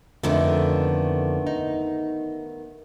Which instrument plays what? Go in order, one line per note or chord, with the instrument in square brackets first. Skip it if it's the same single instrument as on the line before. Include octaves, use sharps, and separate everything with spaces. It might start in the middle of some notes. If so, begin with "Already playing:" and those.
[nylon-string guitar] F2 D3 [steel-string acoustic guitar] D#3 A3 B3
[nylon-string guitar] D#4